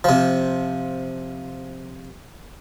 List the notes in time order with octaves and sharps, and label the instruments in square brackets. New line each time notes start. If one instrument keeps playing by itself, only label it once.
[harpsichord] C3 F3